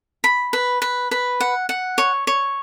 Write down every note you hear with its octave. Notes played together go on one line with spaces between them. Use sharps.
B5
B4
B4
B4
F#5
F#5
C#5
C#5